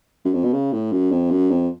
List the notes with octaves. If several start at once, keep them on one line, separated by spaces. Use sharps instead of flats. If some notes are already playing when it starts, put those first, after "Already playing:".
F#2
F2
B2
C#3
A2
F#2
F2
F#2
F2